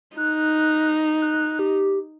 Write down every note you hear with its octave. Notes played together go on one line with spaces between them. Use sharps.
D#4 F#6
F#6
G4